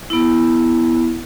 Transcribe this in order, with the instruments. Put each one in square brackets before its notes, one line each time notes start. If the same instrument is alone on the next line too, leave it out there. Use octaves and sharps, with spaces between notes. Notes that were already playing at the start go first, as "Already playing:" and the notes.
[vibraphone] B3 E4